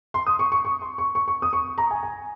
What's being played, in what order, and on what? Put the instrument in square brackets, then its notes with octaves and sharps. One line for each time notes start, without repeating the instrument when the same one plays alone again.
[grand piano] C6
D#6
C#6
C#6
C#6
C6
C#6
C#6
C#6
D#6
C#6
A#5
G#5
G#5